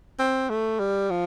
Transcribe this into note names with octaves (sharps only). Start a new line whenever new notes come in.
C4
A3
G3
F3